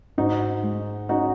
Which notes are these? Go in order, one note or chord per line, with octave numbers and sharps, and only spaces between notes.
G#2 D#4 F#4
G#3
C#4 D#4 F#4